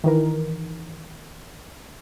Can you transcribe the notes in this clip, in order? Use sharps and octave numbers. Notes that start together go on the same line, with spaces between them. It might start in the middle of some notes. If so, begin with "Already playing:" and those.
D#3 E3 A#4